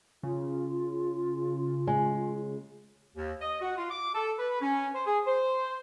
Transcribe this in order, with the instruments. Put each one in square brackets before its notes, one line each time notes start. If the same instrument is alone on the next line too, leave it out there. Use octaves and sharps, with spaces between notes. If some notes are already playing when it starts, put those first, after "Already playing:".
[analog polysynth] C#3 [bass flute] F4
[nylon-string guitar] G#3
[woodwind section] D#2
D#5
F#4
F4
D6
A4
B4
C#4
C5
G#4
C5